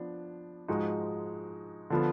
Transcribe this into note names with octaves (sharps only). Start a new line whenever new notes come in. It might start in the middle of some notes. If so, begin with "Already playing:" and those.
Already playing: F3 B3 D4
G#2 F3 G#3 D#4 F#4
D3 F3 B3